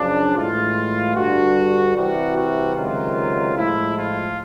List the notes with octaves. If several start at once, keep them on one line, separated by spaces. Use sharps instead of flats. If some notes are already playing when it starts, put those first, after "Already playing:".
Already playing: F#2 C#3 F3 D4
A2 E3 G#3 F4
G2 D3 G3 F#4
C2 C3 E3 G3 F#4
F#4
C#2 C3 D#3 F#3 F4
A2 F3 G#3 E4
F4